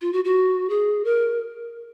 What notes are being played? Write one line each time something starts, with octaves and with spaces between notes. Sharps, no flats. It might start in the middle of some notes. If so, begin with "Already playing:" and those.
F4
F#4
F#4
G#4
A#4